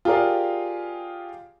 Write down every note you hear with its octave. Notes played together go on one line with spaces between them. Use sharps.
F4 G4 G#4 A#4 D5 F5